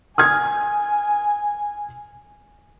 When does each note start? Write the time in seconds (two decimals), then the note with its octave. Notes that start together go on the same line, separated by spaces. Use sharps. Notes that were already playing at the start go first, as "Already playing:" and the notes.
0.18 G#5 D#6 F6 G#6